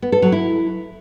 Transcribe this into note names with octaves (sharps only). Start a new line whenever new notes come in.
B3
A4
F#3
E4